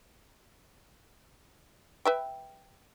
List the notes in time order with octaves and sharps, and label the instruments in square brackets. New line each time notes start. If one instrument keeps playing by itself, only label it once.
[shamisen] B4 E5 G5